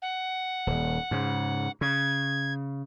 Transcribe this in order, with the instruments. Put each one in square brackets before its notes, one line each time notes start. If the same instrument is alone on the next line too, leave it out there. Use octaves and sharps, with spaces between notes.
[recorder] F#5
[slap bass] D#1
G#2 C#3
[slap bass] C#3 [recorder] G#6